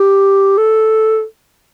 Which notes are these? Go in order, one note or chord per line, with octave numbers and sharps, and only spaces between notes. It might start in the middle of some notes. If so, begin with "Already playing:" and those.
Already playing: G4
A4